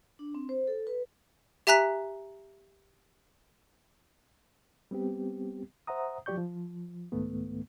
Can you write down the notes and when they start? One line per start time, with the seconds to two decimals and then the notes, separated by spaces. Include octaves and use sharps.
0.19 D4
0.35 C4
0.49 C5
0.67 A4
0.87 B4
1.67 G4 E5 G#5 A#5 F#6 B6
4.91 G3 B3 C4 G4
5.87 C5 E5 F#5 A#5 D#6
6.26 F3 F#3 G4 D5 C#6 G6
6.38 F3
7.12 C2 G#2 D#3 A3 B3